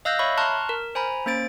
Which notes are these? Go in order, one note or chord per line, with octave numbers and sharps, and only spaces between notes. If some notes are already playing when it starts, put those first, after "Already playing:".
D#5 F5 E6 F#6 G6 A#6
C#5 E5 B5 C#6
A5 A#5 C6 C#6 F6 F#6
A#4
C5 G#5 A#5 B5
A#3 C#4 C5 A6 D7